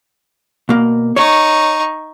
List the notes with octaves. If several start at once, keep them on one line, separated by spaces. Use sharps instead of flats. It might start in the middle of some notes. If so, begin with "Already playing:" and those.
B2 A#3
D#4 C#5 C#6